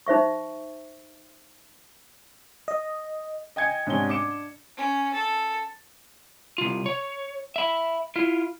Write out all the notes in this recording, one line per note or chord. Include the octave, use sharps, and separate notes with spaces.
D#4 C5 E5 C#6
D#5
D#5 G5 G#5 G#6 C#7
G#2 C3 C#4 D4 G#5 G7
D4 D6 C#7 E7
C#4
A4
C2 F4
C#5
E5 B5
E4 F4